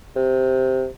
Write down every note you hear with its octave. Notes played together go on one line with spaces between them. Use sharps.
C3